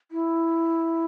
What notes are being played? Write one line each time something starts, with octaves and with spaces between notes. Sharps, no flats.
E4